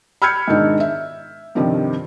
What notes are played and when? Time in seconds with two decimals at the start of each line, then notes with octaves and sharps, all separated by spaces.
0.22 B5 E6 F6 G6 G#6 C#7
0.48 G#2 B2 D#3 G#3 D4 D#4
0.80 E5
1.55 G2 C3 D#3 F3